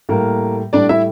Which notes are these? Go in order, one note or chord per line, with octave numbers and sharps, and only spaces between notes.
A2 G3 A#3 A#4
A2 G3 D4 D5
E4 E5